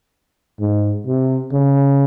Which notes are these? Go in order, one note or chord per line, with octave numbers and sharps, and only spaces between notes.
G#2
C3
C#3